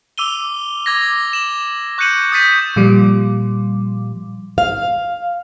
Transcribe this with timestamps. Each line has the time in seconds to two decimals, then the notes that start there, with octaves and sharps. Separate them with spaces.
0.18 D6 E6 D#7 G7
0.86 D6 G#6 A#6
1.33 E7 F#7
1.98 C#6 F#6 G6 C#7 D#7 F#7
2.32 D#6 G6 A6 B6 D#7
2.76 A#2 F3 G3
4.58 F5